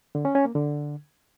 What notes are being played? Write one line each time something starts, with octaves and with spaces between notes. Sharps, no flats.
D3
C#4
C#4
A#3
D3